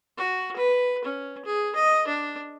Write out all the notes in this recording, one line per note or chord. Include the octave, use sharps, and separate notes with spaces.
F#4
B4
C#4
G#4
D#5
D4